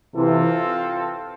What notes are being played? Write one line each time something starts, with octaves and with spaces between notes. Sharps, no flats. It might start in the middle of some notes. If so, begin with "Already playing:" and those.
C3 E3 C4 F4 A4